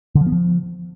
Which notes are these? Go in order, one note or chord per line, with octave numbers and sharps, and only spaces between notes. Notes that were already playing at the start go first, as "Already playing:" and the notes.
D3
F3
B3
F3